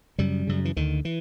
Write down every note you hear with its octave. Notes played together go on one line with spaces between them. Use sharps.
F#2 C#3 G3
F#2 C#3
E3
D2 D3 D#3
E3